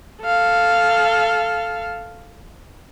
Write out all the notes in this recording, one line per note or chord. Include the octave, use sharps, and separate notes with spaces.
A4 F5